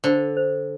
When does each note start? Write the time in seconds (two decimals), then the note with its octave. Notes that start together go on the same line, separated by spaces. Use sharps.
0.04 D3 C5
0.37 C5